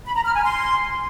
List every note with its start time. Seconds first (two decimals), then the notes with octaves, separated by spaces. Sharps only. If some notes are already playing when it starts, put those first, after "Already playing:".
0.06 B5
0.16 A#5
0.25 F6
0.35 G#5
0.45 C6